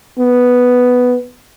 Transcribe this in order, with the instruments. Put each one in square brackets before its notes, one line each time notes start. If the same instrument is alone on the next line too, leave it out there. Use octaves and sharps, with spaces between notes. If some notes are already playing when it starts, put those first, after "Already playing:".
[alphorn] B3